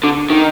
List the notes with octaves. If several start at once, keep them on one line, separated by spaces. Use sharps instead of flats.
D3
D#3